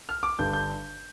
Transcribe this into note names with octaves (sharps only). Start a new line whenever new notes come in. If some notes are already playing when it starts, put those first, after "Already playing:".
F6
D6
G1 G2 D3 G3 D4 G6
G6